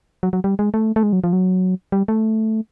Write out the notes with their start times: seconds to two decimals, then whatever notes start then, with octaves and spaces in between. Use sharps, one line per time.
0.23 F#3
0.33 F#3
0.44 G3
0.59 G#3
0.74 A3
0.96 A3
1.03 G#3
1.13 F#3
1.24 F3
1.33 F#3
1.92 G3
2.08 A3